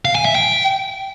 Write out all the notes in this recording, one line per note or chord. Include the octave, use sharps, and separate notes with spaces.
F5
G#5
E5
G5